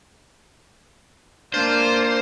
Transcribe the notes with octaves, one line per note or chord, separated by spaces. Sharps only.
A#3 D4 F4 C5